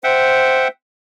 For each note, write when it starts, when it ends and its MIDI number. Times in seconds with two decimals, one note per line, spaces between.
0.04 0.67 72
0.04 0.68 76
0.04 0.68 78
0.04 0.68 79